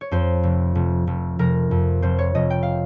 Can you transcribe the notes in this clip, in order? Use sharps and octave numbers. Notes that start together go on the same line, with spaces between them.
C#5
F2 C5
F1
F1
F1
F1 A#4
F2
F1 C5
C#5
F1 D#5
G5
F5